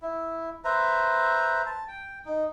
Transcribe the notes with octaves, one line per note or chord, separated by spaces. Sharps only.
E4
B4 C5 E5 A#5
A5
G5
D#4